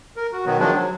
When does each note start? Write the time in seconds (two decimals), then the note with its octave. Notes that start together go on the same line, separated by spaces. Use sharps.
0.16 A#4
0.33 F#4
0.46 B2 D#3 F#3 B3
0.59 D#3 F3 F#3 G#3 D4
0.73 F#3